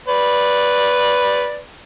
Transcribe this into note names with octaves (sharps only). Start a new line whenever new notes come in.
B4 D5